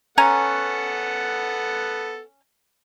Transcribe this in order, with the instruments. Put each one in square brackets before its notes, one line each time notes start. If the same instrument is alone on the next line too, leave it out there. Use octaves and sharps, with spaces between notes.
[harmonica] B3 A4 F#5 [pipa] C#4 G#5 A#5